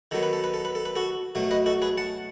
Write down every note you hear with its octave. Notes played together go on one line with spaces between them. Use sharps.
D#3 F#3 B3 A4
B4
A4
B4
A4
B4
A4
B4
F#4 A4
B2 F#3 A3
B4 D#5
F#4 A4
G#4 B4
F#5 A5